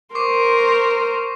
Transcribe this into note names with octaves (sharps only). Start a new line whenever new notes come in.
A#4 C5 C#6 D6 C7